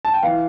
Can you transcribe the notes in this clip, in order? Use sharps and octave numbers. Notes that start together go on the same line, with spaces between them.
A5
G5
E3 F5